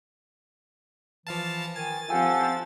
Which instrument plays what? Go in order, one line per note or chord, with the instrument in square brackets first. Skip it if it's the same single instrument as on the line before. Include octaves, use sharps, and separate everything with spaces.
[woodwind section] E3 [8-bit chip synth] F3 F5 A5
[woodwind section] D#3 G#5 [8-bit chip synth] A6
[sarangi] F3 [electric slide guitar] C4 G#5 [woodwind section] G4 A4 F#5